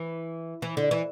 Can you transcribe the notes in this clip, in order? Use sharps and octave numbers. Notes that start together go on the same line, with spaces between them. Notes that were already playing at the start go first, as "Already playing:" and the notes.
Already playing: E3
E3
D3
E3